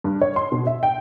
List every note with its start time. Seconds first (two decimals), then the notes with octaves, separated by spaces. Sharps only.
0.04 G2
0.22 C#5
0.36 C6
0.52 B2
0.67 E5
0.83 G5